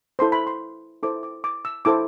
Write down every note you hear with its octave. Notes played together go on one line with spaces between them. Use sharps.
E4 A4 C5 C6
B5
C6
E4 A4 C5 D6
D6
D6
E6
E4 A4 C5 D6